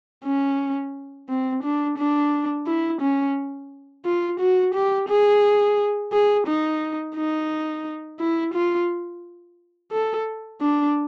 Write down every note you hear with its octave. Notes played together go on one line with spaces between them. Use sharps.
C#4
C4
D4
D4
E4
C#4
F4
F#4
G4
G#4
G#4
D#4
D#4
E4
F4
A4
D4